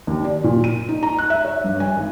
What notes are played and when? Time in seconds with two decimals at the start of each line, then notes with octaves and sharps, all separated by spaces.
0.07 D#2
0.24 D5
0.44 A#2
0.64 D#7
0.89 D#4
1.03 A#5
1.19 F#6
1.30 E5
1.45 C#5
1.64 G2
1.80 G#5
1.97 G#1